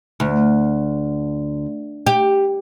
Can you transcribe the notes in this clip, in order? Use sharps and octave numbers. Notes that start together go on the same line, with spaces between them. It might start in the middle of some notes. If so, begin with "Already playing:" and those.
D2
G4